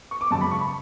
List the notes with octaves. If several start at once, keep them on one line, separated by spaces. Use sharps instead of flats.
C#6
D6
F#2 C#3 G#3 A5
B5
C#6
B5